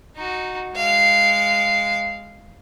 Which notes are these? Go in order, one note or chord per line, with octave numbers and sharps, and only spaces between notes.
D#4 F#4
G#3 F5